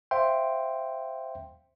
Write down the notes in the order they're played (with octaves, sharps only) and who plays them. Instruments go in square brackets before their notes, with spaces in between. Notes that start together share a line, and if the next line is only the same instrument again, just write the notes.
[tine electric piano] C5 E5 F5 G5 C6